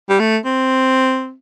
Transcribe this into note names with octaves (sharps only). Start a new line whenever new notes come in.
G3
A3
C4